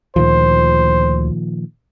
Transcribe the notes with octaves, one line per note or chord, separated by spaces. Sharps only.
D2 A#2 D#3 F3 C5